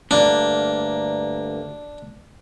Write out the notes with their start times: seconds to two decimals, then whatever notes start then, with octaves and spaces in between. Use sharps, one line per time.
0.11 D2 G2 A#3 D4